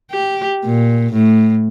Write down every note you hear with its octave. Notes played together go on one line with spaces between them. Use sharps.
G4
A#2
A2